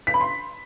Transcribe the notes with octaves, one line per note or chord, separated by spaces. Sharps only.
B6
B5
C6